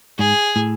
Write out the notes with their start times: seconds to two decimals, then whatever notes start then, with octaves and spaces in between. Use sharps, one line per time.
0.19 G#2 G#4
0.56 A2